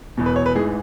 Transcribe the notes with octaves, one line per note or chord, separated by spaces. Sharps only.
E1 E2 B2
B4
C#5
B4
A1 G#2 E3 G#4